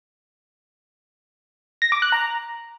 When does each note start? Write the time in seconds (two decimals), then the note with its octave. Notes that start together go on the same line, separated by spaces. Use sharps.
1.82 A#6
1.92 D6
2.02 F#6
2.12 A#5